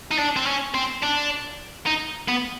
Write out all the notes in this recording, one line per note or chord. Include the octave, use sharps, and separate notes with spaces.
D#4
D4
C4
C#4
C4
D4
D#4
B3